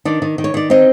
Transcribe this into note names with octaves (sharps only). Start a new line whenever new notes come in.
D#3 D4 D5
D#3
D#3
C#5
D#3 D5
C4 D#4 D#5